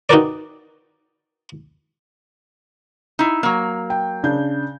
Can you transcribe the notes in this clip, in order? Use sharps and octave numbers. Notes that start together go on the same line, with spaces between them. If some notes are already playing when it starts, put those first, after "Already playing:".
D#4 F#4 G4 A#4 B4 D5
D#4 E4
F#3 A#3
G5
C#3 D4 G6